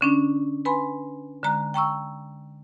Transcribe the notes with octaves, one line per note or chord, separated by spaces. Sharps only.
D3 C#4 D4
B4 G#5 B5 C6
D3 G#3 A#5 F#6
G5 A#5 C#6 E6